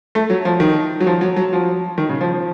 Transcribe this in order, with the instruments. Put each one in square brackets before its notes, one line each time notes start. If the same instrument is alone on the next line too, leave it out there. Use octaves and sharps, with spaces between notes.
[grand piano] A3
F#3
F3
D#3
F#3
F3
F#3
F#3
F3
D#3
C#3
F3
F3